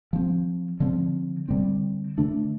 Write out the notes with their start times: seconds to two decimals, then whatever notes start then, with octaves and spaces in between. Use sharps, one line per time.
0.13 F3 C4
0.80 D3 F3 C4
1.49 D3 G3 C4
2.18 D3 A3 D4